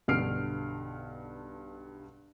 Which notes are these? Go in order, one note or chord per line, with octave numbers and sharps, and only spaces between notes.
B1 G2 D3 F6 C7 D7